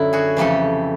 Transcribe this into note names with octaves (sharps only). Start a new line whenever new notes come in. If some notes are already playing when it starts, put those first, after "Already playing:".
Already playing: F#2 D3 F#3 E4
F#4 G#4
F2 C#3 E3 A3 G4 A4